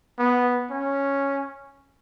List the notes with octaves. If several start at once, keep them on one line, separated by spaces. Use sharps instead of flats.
B3
C#4